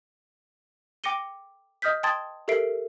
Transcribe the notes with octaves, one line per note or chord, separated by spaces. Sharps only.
G5 D6 A#6 C#7 D#7 G7
D#5 D#6 F6 G6 B6
G5 A5 C6 D#6 G#6 A6
G4 A4 A#4 E5 C7 D7